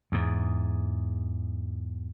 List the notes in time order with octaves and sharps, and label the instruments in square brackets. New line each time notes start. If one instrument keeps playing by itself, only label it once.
[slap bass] E2 G#2